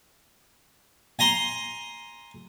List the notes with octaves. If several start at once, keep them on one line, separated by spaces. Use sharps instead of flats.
G#5 A#5 C6